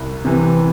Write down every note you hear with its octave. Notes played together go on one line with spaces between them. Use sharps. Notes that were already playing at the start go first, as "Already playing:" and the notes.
Already playing: C2
C3 E3